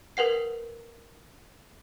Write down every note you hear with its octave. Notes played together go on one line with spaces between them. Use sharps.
A#4 B4 F#5 C7